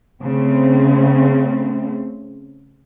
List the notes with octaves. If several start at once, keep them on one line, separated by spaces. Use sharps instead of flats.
C#3 A3 C4